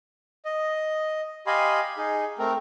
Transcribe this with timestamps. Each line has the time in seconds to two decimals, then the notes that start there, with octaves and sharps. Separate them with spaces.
0.45 D#5
1.47 G4 D#5 F5 G#5 B5 C6
1.97 D#4 G#4
2.39 A3 C4 A#4